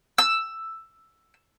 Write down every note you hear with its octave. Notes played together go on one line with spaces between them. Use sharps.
E6